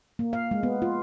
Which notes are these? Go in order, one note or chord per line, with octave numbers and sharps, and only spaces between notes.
A#3
F5
G#3
B3
F4